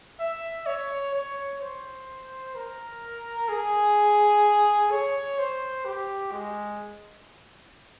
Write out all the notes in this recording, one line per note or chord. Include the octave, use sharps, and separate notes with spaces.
E5
C#5
C#5
C5
A#4
G#4
C#5
C5
G4
G#3